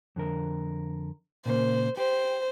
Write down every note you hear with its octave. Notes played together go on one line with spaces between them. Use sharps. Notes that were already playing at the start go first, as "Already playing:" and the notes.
F2 D3 A#4
A#2 C#3 A#3 C5
G4 C5